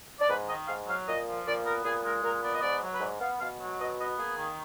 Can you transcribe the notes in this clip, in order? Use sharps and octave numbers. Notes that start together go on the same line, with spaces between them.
D5
G#2 B4
D#3 D#5
G#2 F5
F#3 F5
A#2 D#5
F3
A#2 D5
B3 A#4
A#2 G#4
G#3 A#4
A#2 A#4
B3 D5
D#5
G#2 D5
F#3
B4
G#2 D5
B3 F5
B2 F5
F#3
B2 D#5
B3 D#5
A#3 G#4
D#3